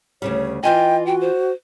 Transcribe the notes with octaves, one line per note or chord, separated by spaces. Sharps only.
D2 C#3 G3 C#5
E3 F4 D#5 G5 G#5
F#4 G5
C5